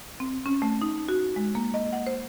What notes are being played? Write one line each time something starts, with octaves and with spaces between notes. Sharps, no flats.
C4
C#4
A3
D#4
F#4
G#3
A#3
D#5
F#5
C5